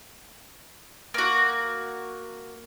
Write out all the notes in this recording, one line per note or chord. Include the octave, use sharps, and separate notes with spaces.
A#3 F#4